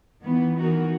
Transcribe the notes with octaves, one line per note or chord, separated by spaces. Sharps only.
D#3 E3 B3
E3 D#4 F#4 A#4